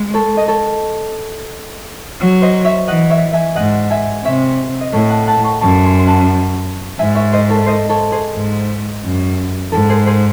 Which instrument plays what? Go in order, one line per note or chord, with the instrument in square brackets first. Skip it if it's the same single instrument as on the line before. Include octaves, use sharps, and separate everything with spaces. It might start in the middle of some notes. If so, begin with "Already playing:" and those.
Already playing: [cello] G#3
[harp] A4 C#5
D#5
A4 C#5
[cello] F#3
[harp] C5 D#5
C#5 E5
[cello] E3 [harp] D#5 F#5
[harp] C#5 E5
E5 G#5
[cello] G#2 [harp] D#5 F#5
[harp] E5 G#5
[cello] C3 [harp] C#5 E5
[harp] D#5
[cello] A2 [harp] A4 C#5
[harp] F#5 A5
F#5 A5
A5 C#6
[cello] F#2 [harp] A5 C#6
[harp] G#5 C6
C6
F#5 A5
[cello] G#2 [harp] E5 G#5
[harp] C#5 E5
C5 D#5
A4 C#5
C5 D#5
A4 C#5
G#4 C5
[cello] G#2
F#2
[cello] G#2 [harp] A4
[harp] G#4 C5
G#4 C5